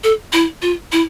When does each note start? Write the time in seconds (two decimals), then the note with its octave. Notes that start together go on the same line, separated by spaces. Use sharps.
0.04 A4
0.33 E4
0.62 F4
0.92 E4